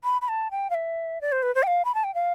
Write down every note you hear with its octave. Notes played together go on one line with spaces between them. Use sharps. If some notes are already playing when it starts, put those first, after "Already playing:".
B5
B5
A5
G5
F5
E5
D5
C5
B4
C5
G5
F5
B5
A5
G5
F5